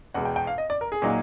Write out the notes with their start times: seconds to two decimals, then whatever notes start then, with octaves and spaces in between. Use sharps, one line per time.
0.14 E2 B2 G#3 F#5
0.25 G5
0.36 G5
0.47 F5
0.58 D#5
0.70 D5
0.81 A#4
0.92 G#4
1.02 A#2 F#3 A#3 D#4